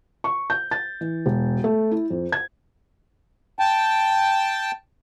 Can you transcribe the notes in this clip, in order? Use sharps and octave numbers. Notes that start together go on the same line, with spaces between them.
C#6
G6
A6
E3
E1
A3
E4
F2
G#6
G5 A5